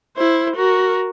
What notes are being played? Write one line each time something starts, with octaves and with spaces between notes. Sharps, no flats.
E4 C5
F#4 A#4